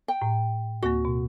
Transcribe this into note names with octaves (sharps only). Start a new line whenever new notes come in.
G5
A2
D2 A#3 F#4
B2